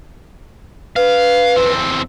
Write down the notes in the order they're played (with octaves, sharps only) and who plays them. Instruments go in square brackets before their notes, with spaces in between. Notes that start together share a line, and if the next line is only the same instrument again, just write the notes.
[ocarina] B4 [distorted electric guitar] F5
[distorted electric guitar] E2 C4